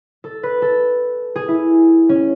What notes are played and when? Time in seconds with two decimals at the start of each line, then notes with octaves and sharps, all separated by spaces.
0.24 A4
0.43 B4
0.62 A4
1.36 G#4
1.48 E4
2.09 C#4